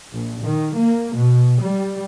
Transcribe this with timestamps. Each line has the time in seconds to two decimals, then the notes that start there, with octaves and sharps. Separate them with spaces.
0.13 A#1
0.42 D#3
0.76 A#3
1.15 B2
1.61 G3